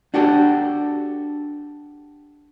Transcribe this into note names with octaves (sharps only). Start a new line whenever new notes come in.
D4 F#4 G4 A4